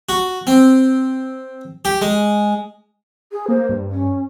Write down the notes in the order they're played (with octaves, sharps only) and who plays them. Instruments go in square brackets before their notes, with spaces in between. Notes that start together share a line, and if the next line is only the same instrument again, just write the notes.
[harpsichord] F#4
C4
G4
G#3
[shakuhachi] G#4
[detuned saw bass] A#3 [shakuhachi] C5
[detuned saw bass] G2
[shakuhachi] C#4